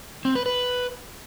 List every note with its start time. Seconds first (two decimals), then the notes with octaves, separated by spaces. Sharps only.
0.25 C4
0.35 B4
0.46 B4